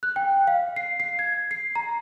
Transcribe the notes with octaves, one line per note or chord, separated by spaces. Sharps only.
F#6
G5
F5
C7
C7
G#6
C7
A#5